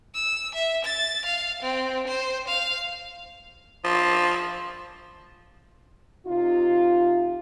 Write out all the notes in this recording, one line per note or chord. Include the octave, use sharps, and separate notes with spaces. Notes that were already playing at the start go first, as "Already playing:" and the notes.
E6
E5
A6
F5
C4
C5
F5
F3
C3 D#4 F4